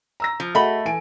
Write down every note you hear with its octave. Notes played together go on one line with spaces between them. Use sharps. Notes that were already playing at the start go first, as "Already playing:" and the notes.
A#5 E6 A#6
F3
A3 F#4 G#4 D#5 F#5 B5
E3 G#5 D7